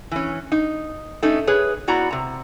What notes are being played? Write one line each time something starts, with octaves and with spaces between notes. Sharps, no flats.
E3 C#4
D#4
A3 C#4 D#4
G#4 B4 C#5
B3 E4 F#4 D5 A#5
C3 A#5